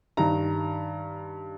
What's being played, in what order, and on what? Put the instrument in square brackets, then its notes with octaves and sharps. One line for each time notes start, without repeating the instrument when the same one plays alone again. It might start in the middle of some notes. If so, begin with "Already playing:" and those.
[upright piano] G2 D#3 A#5